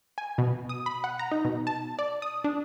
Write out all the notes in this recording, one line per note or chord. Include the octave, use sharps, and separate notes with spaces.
G#5
B2
D#6
B5
F#5
A#5
D#4
B2
A5
D5
D#6
D4